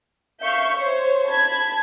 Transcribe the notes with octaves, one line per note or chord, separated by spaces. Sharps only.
E5 F5 C#6 G6 C#7
C5 C#5
A5 B5 G#6